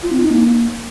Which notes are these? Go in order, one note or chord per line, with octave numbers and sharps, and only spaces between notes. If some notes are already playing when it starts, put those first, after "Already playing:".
F4
C4
D#4
A#3